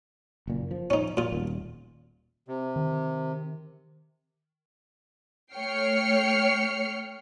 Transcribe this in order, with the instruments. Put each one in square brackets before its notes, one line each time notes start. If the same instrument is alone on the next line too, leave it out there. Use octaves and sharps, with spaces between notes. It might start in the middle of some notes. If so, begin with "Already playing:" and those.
[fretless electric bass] F#1 A#2
F3
[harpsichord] C#4 D#4
A#2 F4
[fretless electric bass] D#1
[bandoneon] C3
[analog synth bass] D#3
[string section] A3 C#5 G5 F6 C7 C#7